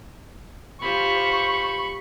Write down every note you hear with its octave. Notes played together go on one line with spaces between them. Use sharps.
F4 G4 C5 B5 C#6